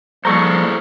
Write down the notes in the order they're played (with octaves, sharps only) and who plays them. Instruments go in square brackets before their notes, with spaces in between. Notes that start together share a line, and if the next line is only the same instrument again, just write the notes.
[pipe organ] F3 G3 A#3 [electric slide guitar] G#4 A4 C5 [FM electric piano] A#5 C#6